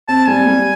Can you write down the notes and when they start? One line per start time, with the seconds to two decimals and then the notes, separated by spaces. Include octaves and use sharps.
0.08 C4 A5
0.27 G3 G#5
0.47 G3